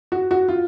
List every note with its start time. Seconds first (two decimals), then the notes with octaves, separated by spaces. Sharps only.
0.12 F#4
0.31 F#4
0.48 F4